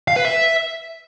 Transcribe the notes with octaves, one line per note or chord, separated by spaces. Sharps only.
F5
B4
E5